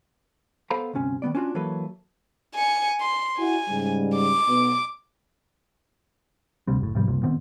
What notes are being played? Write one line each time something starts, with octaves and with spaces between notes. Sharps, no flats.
B3 A4 C5 F5 A#5 B5
D2 G2 C3 C#4
D#3 E3 B3 D5
C#4 D4 F4 F#4
E3 F#3 A#3 A4 B4 C#5
G#5 C#7
C6
E4 F#4 G#5
G#2 C#3 G3
D6
B1 B3
D2 C3 G3 C4
F#1 A2
G#2 C3 F3 G3
F#1 C2 A#2
A#2 D#3 B3 C4